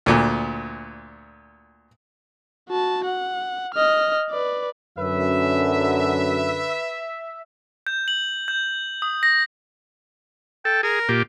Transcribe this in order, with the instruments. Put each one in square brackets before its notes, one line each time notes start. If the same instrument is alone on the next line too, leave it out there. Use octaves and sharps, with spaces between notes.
[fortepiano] D2 A#2
[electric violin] F#4 A5
F#5
D#5 F6
B4 D5
[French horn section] F#2 [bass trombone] D3 [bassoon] B4 [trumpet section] E5
[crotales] G6
F#7
G6
D#6
A#6
[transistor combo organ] A4 [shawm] G5
[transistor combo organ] G#4 [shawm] A#4
[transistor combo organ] A#2 G4